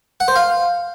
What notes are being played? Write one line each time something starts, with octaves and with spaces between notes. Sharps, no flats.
F#5
C5
F5